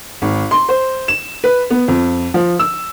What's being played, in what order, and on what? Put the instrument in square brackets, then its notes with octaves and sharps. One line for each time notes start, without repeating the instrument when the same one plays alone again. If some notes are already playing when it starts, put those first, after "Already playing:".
[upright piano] G#1
C6
C5
E7
B4
B3
F2
F3
E6